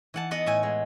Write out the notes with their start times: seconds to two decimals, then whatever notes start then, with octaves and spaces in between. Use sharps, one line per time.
0.14 E3 F#5 A5
0.31 B3 D#5 F#5
0.46 A2 E5 G#5
0.63 G#3